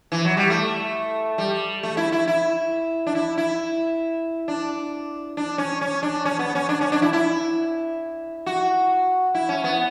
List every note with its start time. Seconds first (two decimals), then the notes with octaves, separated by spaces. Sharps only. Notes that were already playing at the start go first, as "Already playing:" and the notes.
0.12 E3
0.25 F#3
0.37 G3
0.50 A3
1.38 G3
1.83 A3
1.97 E4
2.12 E4
2.28 E4
3.07 D4
3.15 E4
3.38 E4
4.48 D4
5.37 D4
5.58 C#4
5.81 C#4
6.03 D4
6.25 C#4
6.39 B3
6.55 C#4
6.69 D4
6.81 C#4
6.92 D4
7.02 E4
7.13 E4
8.46 F#4
9.35 E4
9.49 C#4
9.64 B3